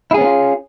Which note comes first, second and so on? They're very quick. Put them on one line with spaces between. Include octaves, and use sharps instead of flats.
E4 G#4 C#4 B3 F4